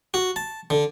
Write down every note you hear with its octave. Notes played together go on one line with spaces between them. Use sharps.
F#4
A5
D3